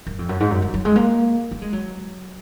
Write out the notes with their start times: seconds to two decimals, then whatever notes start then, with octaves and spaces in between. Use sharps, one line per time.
0.07 F#2
0.19 F2
0.29 F#2
0.40 G#2
0.51 F#2
0.62 F3
0.74 F#3
0.85 G#3
0.96 A#3
1.51 A#3
1.62 G#3
1.73 F#3